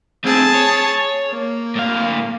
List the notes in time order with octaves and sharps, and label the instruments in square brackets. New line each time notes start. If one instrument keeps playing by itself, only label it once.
[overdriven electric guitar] A3 C4 [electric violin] G#4 A5
[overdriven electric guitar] C#5
[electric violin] A#3
[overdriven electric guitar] A2 F5